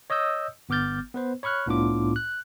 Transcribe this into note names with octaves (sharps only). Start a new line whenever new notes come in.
C#5 D#5 D#6 E6 G6
G1 B3 D6 F6 G6 A6
B3 B4 C5
C#5 B5 C#6 F6 F#6
C2 A2 B3 D4 F4 D6
F#6